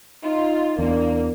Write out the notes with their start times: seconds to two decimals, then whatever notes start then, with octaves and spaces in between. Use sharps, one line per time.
0.24 D#4 F4
0.79 E2 A#3 D4